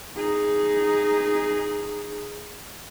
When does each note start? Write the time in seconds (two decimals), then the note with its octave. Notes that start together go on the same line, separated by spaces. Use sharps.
0.16 D#4 G#4